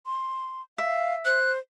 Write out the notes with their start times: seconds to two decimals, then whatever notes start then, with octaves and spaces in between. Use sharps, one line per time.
0.06 C6
0.78 E5 F5
1.25 C5 F#6